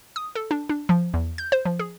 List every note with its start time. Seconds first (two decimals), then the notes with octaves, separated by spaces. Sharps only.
0.16 D#6
0.35 A4
0.51 D4
0.69 D4
0.89 F3
1.14 E2
1.38 G6
1.52 C5
1.65 F3
1.79 G#4